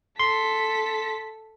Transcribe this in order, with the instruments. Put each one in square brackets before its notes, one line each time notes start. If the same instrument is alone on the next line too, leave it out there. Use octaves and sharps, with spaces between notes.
[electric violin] A4 B6 [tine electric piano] C6